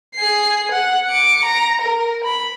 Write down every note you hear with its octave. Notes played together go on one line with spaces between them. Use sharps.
G#4 C7
F#5
D6 C#7
A#5
A#4
B5